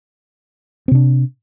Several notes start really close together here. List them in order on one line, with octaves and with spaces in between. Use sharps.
C4 C3 D4